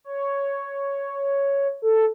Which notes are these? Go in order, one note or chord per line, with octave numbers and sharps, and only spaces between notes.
C#5
A4